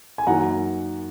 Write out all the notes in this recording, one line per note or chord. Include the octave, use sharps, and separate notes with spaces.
G#5
F#2 D#3 A#3 F#5 A#5